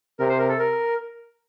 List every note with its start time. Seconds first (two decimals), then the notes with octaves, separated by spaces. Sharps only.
0.19 C3 A#4
0.29 C5
0.39 A#4
0.49 A4
0.59 A#4